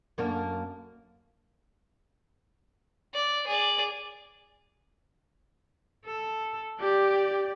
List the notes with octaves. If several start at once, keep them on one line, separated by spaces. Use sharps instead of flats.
F#2 A#3 D4
D5
G#4 D5
A4
G4 D5